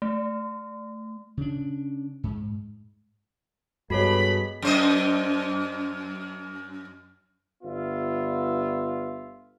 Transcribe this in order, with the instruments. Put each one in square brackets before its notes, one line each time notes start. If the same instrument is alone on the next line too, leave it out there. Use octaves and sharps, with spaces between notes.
[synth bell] A3
[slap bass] C#3 D4
G#2
[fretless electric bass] G2 [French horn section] G#3 B3 [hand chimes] F#4 A4 C#5 [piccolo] B5
[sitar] F#2 C5 D#5
[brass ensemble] G1 B3 F4 E5